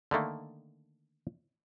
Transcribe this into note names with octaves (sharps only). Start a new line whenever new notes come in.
D3 D#3 A3 A#3